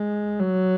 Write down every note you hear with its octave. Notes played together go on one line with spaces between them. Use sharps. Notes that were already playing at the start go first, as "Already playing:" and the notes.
Already playing: G#3
F#3